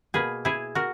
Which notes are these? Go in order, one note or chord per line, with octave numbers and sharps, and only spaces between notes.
B2 A#3 G#4 B4
E4 G#4
F#4 A#4